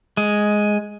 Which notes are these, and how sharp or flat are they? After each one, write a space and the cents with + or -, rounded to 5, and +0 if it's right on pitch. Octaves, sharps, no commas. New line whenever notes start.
G#3 +5